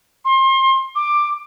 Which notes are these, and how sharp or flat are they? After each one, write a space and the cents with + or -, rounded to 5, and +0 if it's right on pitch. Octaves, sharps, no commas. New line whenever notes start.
C6 +30
D6 +15